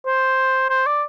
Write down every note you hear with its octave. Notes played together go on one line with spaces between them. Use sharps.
C5
C5
D5